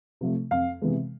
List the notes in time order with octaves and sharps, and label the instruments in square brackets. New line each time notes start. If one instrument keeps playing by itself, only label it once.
[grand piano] C3 F3 A3
F2 F5
C3 E3 G#3 B3